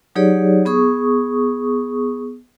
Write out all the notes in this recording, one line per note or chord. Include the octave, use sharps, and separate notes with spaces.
F#3 D#4 G4 G#4 C#5 D5
B3 G#4 C#6 D#6